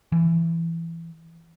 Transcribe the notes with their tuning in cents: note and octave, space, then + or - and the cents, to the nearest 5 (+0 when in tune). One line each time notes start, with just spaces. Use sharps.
E3 +15